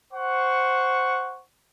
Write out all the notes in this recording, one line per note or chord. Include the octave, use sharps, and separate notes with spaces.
C5 F#5 C#6